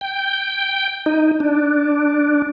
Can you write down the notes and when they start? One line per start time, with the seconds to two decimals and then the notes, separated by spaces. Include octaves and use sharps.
0.01 G5
1.06 D#4
1.40 D4